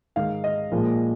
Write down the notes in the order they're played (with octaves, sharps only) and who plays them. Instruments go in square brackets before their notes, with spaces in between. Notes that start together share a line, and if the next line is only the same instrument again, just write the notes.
[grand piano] G#2 D#3 G#3 F5
D#5
A#2 F3 G#3